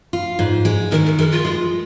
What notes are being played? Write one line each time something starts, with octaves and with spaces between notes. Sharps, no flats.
F4
G#2
G#3
D#3 A#4
A#4
G#3 A#4
F4
G#3